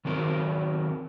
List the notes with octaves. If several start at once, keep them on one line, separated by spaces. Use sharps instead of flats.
D#3 F#3 C4 A#4